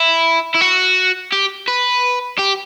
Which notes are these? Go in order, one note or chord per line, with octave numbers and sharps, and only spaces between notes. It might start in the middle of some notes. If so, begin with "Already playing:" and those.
Already playing: E4
E4
F#4
G4
B4
G4